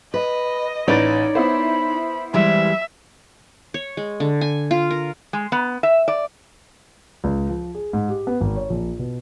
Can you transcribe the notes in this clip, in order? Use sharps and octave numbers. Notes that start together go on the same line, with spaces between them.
B4 D#5
A1 D#4 B4 C#5 D5 A6
B3 E4 C5 B5
E3 G3 G#3 E5
C#5
G#3
D3
G#5
F4
A#4
G#3
B3
E5
D5
C#2
F3
G#4
G#2
G4
B3
G#1
C#5
A#1
B2